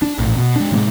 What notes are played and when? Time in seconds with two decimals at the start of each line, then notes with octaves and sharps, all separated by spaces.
0.02 D4
0.19 A#1 A2
0.37 B2
0.56 G#3 D4
0.72 A2 C3 G#3 A#3